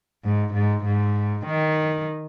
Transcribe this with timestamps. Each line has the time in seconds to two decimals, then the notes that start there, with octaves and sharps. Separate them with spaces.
0.24 G#2
0.54 G#2
0.85 G#2
1.47 D#3